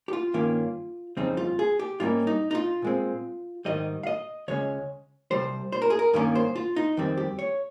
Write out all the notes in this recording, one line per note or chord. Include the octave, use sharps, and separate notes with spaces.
G4
F4
G2 D#3 A#3 C#4
F2 C#3 G3 C4 D#4
F4
G#4
G4
G#2 G3 A#3 C#4 F4
D#4
D#4
F4
A#2 G#3 C4
G#2 D#3 G3 D#5
F5
D#5
C#2 C#3 G#3 C#4 C#5
C2 C3 G3 C5
C5
A#4
G#4
A#4
G2 D#3 A#3 C#4 A#4
C5
F4
D#4
F2 D#3 G3 C4
G4
C#5